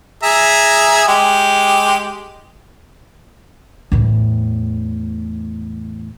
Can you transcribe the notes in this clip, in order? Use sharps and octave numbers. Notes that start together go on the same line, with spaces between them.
G#4 E5 A#5
G#3 G4
E2 A2